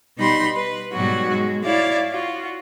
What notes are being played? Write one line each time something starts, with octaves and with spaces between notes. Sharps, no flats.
B2 G3 D#4 G4 B5 C6
B4
G#2 B2 F#3 G3 F#4
G#3
E4 C#5 D5 F5
F4 F#4